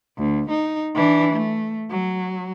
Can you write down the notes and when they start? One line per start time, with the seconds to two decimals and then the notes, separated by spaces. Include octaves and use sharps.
0.18 D2
0.50 D#4
0.95 E3 D4
1.33 A3
1.90 F#3